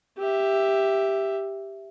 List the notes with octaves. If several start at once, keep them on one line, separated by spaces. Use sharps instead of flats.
G4 E5